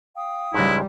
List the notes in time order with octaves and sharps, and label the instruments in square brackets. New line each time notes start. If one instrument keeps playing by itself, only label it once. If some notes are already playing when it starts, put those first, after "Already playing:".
[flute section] F5 G5 D#6
[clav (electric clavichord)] C#2 G#2 [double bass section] G3 [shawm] E4